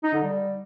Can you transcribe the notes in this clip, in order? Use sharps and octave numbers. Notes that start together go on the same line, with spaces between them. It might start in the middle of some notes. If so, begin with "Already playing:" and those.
D#4
D3
G3